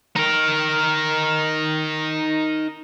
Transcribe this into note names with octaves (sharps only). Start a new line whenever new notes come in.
D#4 A#4